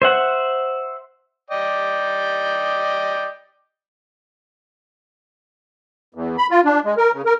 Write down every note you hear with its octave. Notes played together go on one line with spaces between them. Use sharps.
C5 E5 F#5
D5 D#5 G5
E2
B5
F4
D4
G#3
A#4
C#3
A#4